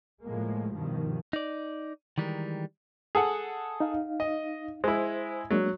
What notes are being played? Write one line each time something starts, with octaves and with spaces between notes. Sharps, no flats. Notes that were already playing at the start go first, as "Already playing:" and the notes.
A2 F3 G#3 A#3
G2 B2 D#3 F3
D#4 D5
D#3 E3 G3 G#3 A#4
G#4 A4 F#5
D#4 F5
D#5
G#3 E4 C5
F#3 G#3 A#3 D4